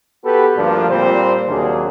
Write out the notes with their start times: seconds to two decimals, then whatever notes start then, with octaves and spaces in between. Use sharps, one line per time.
0.25 B3 F#4 G4 A4 B4
0.57 D2 G2 F3 A#3 D4
0.90 A#2 G3 C4 C5
1.48 D#2 C3 F#3 A#3 D4 G#4